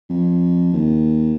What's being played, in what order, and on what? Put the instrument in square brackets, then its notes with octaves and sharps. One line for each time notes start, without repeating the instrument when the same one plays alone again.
[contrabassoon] F2
D#2